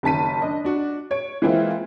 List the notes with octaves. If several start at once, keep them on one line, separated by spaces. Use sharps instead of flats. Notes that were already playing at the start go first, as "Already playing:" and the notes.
F#1 D#3 A5 B6 D#7
D4 D#5
D4 F#4
C#5 D7
E3 G#3 A#3 C4 E4 F4